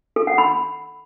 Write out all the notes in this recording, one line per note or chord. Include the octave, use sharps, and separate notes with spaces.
A4
F#5
B5